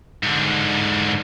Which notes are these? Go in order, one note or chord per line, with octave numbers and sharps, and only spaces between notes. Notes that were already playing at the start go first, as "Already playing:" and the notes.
G#2 D3